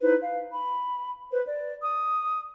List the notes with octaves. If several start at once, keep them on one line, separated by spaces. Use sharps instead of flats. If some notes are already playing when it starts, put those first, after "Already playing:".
D#4 E4 B4 C5
F5
B5
B4 C5
D5
D#6